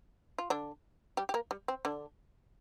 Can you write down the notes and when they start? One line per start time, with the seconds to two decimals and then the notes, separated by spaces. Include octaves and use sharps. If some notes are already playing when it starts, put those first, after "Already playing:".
0.38 F4
0.50 D3 D4
1.17 G3 G4
1.29 G4
1.34 A#3 A#4
1.51 G3
1.68 C4
1.85 D3 D4